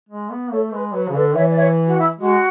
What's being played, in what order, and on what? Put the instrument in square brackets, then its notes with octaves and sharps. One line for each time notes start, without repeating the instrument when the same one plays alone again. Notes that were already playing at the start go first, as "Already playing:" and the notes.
[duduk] G#3
B3
[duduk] A3 [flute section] A4 C#5
[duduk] G#3 [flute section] B4
[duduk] F#3 [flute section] B4
[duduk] C#3
[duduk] D3 [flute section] B4 D5
[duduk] E3 [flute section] C#5 E5
[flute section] D5
C#5 E5
F#4
E4
[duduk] G#3 [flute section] F#4